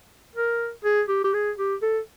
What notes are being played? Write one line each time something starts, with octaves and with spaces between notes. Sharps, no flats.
A#4
G#4
G4
G4
G#4
G4
A4